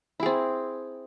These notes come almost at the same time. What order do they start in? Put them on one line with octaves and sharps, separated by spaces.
E4 G#4 C4